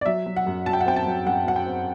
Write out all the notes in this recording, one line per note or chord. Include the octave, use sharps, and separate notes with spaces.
D5
F#3 E5
F#3
F#5
F#2
F#3 A5
G5
F#5
C4 G5
A5
F#3
F#2 F#5
F#3 F#5
G5
C4